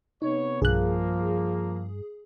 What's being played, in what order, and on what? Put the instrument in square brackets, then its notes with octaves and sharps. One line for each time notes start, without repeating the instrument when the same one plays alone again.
[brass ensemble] C3 B3 C#5 [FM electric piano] D#4
[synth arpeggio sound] B1 F#6 [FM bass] G2 [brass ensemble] F3 A#3 [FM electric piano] G#4